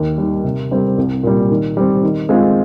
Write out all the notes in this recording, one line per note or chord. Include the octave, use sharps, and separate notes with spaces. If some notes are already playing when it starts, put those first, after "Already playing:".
Already playing: D#2
D#3 G3
C3
G3 C4 G4 A#4
C2
A#2 G3
D#3
G3 C4
D#3
G#3 C4 F4